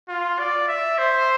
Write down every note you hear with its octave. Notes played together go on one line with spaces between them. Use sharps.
F4
D5
E5
C5